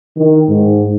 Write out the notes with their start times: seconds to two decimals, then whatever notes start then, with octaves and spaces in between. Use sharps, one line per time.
0.17 D#3
0.48 G#2